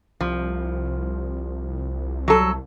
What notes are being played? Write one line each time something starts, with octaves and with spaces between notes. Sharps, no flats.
C2 F3
F#3 A4